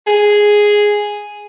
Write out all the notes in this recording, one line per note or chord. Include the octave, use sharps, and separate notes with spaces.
G#4